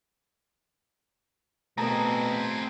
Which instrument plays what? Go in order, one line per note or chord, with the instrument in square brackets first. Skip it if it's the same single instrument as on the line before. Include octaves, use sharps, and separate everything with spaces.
[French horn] B2 [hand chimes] A3 A#4 D#6 [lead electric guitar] C4 G#4 [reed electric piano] A5 A#5